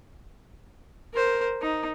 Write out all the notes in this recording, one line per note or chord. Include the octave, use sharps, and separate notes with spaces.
A#4 C5
D#4